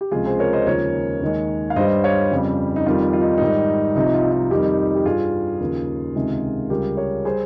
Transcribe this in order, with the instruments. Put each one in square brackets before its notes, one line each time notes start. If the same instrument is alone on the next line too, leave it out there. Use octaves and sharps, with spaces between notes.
[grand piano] G4
C#2 C3 F3 G#3 F4 G#4
G#4 C5
A#4 C#5
C5 D#5
D#2 C#3 F3 G#3 A#4 C#5
D#2 D#3 G#3
F5
G2 G3 C5 D#5
C#5 F5
F2 C#3 G3
D#4
F2 D#3 G3 F4
F4
D#4
G#2 D#3 G3 D#4
C2 C3 F3 D#4
F4
D#4
F2 D#3 G3 D#4 G4
G4
G2 G3 F4 G#4
D#2 C#3 F3
C#2 C3 D#3 G#3
C#2 C#3 G3 G4 A#4
A#4 C#5
G3 G#4 C5